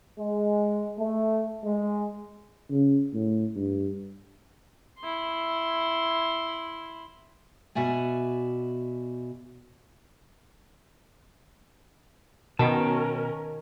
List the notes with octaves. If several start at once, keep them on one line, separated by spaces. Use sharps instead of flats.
G#3
A3
G#3
C#3
A2
G2
E4 C6
B2 F#4 D5 E5 G#5
B2 D#3 C#4 A#4 G5 A5